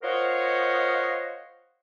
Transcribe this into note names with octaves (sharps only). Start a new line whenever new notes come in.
F4 A#4 C5 C#5 D#5 F#5